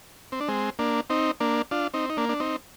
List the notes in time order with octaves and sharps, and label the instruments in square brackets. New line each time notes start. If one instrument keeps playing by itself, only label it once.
[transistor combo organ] C4
D4
G#3 C4
A#3 D4
C4 D#4
A#3 D4
D4 F4
C4 D#4
D#4
A#3 D4
D4
C4 D#4